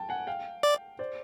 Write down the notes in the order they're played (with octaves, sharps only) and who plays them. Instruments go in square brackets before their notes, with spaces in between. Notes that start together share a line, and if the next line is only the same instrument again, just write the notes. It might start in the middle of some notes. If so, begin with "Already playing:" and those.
Already playing: [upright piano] G5 A5
F#5 G#5
F5 G5
[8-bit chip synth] D5
[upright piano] C5 D5